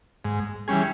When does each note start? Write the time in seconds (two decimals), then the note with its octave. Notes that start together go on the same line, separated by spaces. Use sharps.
0.25 G#2
0.68 E3 G3 C#4 G#4